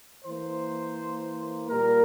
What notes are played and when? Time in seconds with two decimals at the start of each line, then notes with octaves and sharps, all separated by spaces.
0.25 E3 A#3 C5
1.70 A#2 G3 A#3 A#4